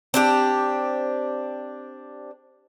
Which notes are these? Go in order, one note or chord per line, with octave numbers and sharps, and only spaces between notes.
C4 D4 G4